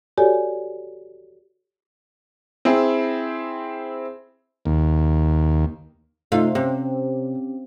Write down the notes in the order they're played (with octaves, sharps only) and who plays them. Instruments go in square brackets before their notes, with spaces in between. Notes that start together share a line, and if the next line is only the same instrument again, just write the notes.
[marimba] F#4 G4 A4 C#5 D5 G#5
[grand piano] C4 E4 G#4
[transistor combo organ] D#2
[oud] C3 F5 [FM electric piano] A3 D#4 F4
[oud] C3 [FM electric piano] C4 C#4 G4